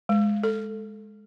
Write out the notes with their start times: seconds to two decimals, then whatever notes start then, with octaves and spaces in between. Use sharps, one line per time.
0.09 G#3
0.43 A4